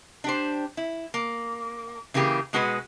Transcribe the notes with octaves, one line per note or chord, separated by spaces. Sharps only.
D4 G4 C5
E4
A#3
C#3 E3 A#3 G4 G#4
B2 G#3 F#4 G#4 B4